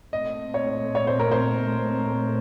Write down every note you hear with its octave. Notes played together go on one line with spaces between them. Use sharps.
A#2 A3 C4 D#5
C#5
C#5
C5
A#4
C5